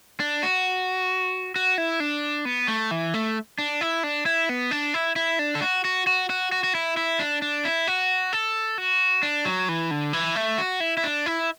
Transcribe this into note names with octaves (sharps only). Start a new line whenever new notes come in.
D4
F#4
F#4
E4
D4
B3
A3
E3
A3
D4
E4
D4
E4
B3
D4
E4
E4
D4
A4
F#4
F#4
F#4
F#4
F#4
F#4
E4
E4
D4
D4
E4
F#4
A4
F#4
D4
F#3
E3
D3
E3
A3
F#4
E4
E4
D4
E4